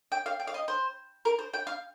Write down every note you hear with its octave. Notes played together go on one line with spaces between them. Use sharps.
G5
F5
G5
F5
D#5
C5
A#4
C5
G5
F5